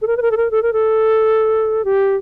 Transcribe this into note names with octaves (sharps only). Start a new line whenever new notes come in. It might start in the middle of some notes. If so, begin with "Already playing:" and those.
A4
A#4
B4
A#4
A4
A#4
A4
A#4
A4
G4